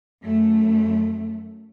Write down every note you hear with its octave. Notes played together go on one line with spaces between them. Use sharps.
F#2 A3